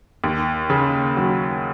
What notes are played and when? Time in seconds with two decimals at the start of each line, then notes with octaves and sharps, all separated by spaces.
0.24 D#2
0.70 C#3
1.17 F#3